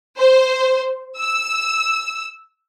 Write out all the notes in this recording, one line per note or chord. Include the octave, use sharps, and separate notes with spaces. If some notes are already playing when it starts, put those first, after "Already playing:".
C5
E6